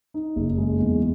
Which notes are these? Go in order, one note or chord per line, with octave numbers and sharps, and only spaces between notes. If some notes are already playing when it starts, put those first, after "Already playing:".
D#4
F#1
G#3
E2